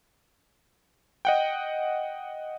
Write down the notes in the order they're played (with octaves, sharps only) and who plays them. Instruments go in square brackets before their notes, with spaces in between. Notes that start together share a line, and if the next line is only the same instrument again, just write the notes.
[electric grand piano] D#5 F#5 G5